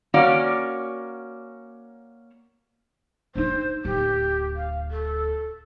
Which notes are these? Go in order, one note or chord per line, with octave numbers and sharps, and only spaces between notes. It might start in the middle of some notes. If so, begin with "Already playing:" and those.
A#3 C#4 F#4 D5
D4 D#4 C5
D1 G4
F5
A4